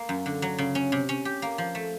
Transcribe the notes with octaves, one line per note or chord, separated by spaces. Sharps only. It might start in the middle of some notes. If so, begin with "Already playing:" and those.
Already playing: A#3
F#2
D3
F#3
C#3
C#4
C3
C#4
G4
A#3
F3
A3